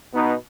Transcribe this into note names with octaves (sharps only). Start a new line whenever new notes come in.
B2 B3 D#4